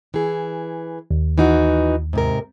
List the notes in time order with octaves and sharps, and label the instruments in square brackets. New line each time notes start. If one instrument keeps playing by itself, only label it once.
[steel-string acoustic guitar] E3 G#4
[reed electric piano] D#2
[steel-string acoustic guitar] E3 D#4 F#4
G#2 C3 A#4